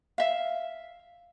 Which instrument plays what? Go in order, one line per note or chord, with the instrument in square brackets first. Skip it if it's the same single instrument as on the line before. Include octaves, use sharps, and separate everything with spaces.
[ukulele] E5 F5